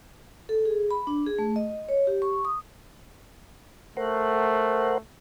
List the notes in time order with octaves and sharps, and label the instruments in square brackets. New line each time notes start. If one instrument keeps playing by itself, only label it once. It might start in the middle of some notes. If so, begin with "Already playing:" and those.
[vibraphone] A4
G#4
B5
D4
G#4
A3
D#5
C#5
G4
C#6
D#6
[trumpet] A3 [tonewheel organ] A#4 C5 F#5